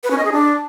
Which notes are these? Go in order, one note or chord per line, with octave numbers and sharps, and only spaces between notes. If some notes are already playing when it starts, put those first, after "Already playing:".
B4
C#4
D#5
G#4
D4